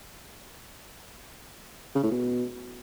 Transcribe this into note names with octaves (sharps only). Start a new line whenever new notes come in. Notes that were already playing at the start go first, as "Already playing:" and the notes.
C#3
A2
B2